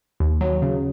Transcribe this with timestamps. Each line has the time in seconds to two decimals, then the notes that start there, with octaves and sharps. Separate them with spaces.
0.20 D#2
0.41 F#3
0.62 C#3